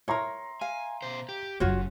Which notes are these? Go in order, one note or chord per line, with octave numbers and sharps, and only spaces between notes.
A#4 C#5 E5 A#5 C6
F5 G#5
B2 C5
G4
F#1 F#2 C#3 F4 F#4 C#5